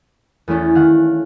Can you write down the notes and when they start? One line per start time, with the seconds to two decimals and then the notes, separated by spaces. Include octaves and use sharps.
0.48 E2 A3 C#4 E4 A4
0.75 D#3 F5 F#5